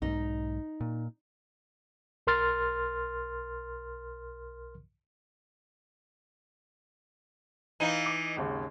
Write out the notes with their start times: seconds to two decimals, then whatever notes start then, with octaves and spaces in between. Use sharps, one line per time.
0.02 B1 G#2 D#4
0.81 A#2
2.27 B1 A#4 C6 F6 A6
7.80 E3 D#4 F5 A#5 D#7
8.06 D6
8.37 G#1 D#2 C#3